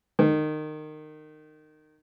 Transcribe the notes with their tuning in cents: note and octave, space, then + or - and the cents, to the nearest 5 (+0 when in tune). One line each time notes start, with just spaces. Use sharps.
D#3 -20